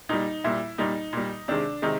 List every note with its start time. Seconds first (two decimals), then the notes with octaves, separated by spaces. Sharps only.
0.09 A#2 G3 D#4
0.44 A#2 G3 E4
0.78 A#2 G3 D#4
1.13 A#2 G3
1.48 C3 D#3 G#3 D4
1.82 C3 D#3 G#3 D#4